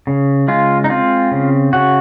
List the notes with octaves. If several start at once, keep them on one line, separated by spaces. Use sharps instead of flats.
C#3
G#3 F4
D#4
C4 F4
C#3
C#3 F#4